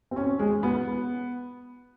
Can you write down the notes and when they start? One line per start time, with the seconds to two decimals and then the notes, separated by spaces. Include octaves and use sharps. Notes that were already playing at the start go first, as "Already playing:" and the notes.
0.11 C4
0.16 C#4
0.39 G#3
0.63 B3